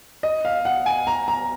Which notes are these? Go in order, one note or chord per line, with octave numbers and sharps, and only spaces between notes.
D#5
F5
F#5
G#5
A#5
A#5